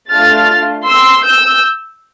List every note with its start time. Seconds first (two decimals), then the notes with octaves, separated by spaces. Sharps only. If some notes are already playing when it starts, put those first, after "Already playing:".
0.11 A3 D4 F4 F6 A6
0.87 C6 E6
1.25 E6 G6